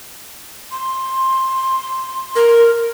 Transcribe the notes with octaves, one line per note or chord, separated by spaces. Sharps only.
C6
A#4